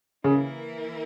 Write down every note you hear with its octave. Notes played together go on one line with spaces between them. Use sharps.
C#3 E3 A#3 E4 A#4